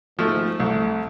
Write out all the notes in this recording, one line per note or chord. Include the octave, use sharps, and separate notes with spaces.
G#2 F3 A3
C2 A3